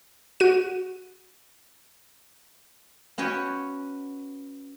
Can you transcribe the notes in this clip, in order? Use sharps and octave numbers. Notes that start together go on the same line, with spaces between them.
F#4 D#7
B3 C#4 F#4 C#5 G5